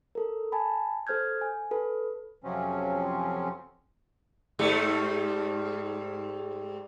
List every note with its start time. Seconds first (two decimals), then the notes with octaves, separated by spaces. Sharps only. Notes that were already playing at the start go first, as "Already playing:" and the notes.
0.15 A4 A#4
0.52 G#5 A5 B5
1.07 A4 C5 F6 G6 G#6
1.41 G#5
1.71 A4 B4
2.44 F2 C3 F3 F#3 C4 C#4
4.59 G#2 G3 A3